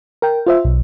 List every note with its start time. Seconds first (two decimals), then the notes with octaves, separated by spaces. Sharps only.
0.22 A#4 G5
0.46 F4 C5 E5
0.64 B1